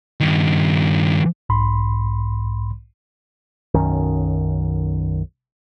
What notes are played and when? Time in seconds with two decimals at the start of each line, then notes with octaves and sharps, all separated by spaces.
0.20 G2 D#3
1.49 B1 G#2 B5 C6
3.74 B1 F#2 D#3 C#4